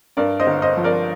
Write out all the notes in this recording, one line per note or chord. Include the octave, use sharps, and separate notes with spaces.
G2 A#4 D5
C5 D#5
G1
C5 D#5
F3
A#4 D5